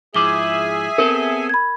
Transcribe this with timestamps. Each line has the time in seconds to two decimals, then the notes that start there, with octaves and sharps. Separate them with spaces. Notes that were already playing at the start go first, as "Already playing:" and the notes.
0.14 G#2 F3 E4 G#4 E5 G#5 D6 G7
0.98 B3 C4 A4 A#4
1.49 B5 G#6